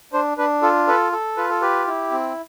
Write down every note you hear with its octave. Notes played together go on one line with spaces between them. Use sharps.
D4 C5
D4 B4
F4 A4
A4 B4
A4
F4 B4
A4
G4 B4
E4
C4